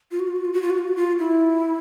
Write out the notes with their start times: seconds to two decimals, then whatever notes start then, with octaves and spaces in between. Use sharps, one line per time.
0.11 F4
0.20 F#4
0.28 F4
0.36 F#4
0.45 F4
0.53 F#4
0.62 F4
0.70 F#4
0.78 F4
0.88 F#4
0.96 F4
1.19 E4